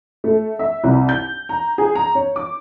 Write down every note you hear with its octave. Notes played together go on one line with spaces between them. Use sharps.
A3
E5
C2
G6
A#5
G#4
A#5
C#5
D6